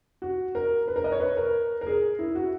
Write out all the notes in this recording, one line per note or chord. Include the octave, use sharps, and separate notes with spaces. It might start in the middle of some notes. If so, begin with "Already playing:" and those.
F#4
A#4
B4
A#4
D#5
C#5
B4
A#4
A#4
G#4
E4
F#4